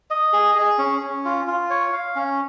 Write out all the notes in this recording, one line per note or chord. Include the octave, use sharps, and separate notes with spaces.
D#5
G#4
G#4
C#4
C#4
F4
F4
C#5
F5
C#4